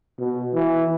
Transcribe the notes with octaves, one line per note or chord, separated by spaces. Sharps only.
B2
E3